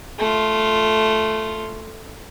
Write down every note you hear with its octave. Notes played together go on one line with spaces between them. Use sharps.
A3 F4